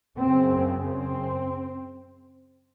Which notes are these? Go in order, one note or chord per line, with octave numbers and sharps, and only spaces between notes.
F#2 C#3 C4
C4